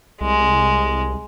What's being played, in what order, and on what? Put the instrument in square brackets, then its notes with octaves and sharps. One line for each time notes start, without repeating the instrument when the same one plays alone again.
[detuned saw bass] C2 [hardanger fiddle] G#3